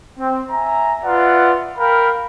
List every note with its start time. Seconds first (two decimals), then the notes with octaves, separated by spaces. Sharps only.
0.18 C4
0.51 E5 G#5 A#5
1.04 F4 B4 D5 E5 F#5
1.78 A#4 F5 G5 B5